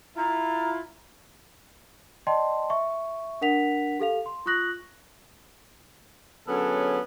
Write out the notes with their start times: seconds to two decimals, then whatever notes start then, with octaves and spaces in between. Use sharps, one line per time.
0.17 E4 F4 A#5
2.27 D5 D#5 G5 A5 C6
2.70 E5 C#6
3.41 D4 A#4 F#5 B6 F7
4.00 G4 A4 F5 F7
4.26 C6
4.46 F4 C#6 D#6 F#6 A#6 F#7
6.47 D3 F#3 B3 C#4 G#4 A4